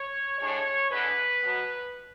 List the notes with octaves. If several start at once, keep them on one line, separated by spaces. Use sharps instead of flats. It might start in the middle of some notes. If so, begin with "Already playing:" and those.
Already playing: C#5
A2 G#3 D4 C#5
E2 D3 G#3 B4
B2 F#3 B3